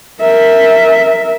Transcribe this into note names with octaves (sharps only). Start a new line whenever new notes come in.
A#4 E5